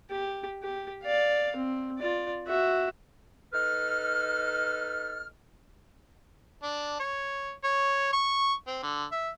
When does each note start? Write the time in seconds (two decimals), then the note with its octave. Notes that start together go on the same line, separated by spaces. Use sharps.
0.10 G4
0.63 G4
1.03 D5 F5
1.56 C4
1.99 F4 D5
2.47 F#4 E5
3.53 D#4 A4 B4 F6
6.63 D4
7.00 C#5
7.64 C#5
8.12 C#6
8.67 C4
8.83 D3
9.11 E5